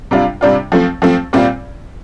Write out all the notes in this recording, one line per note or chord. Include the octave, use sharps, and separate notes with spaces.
C3 G3 D4 F4
C3 G3 D4 F4
F3 A3 C4
F3 A3 C4
A#2 G3 C4 F4